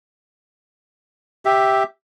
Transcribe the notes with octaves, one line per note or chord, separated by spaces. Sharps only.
G4 E5